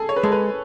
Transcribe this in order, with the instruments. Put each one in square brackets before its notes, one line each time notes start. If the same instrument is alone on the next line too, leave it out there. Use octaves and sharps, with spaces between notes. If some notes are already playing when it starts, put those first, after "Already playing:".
Already playing: [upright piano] G#4 A4
C#5
B4
[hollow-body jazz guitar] G#3 [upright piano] A4
[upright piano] B4